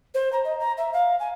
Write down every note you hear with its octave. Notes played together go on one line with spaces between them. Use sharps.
C5
A#5
D#5
A#5
E5
F5
G#5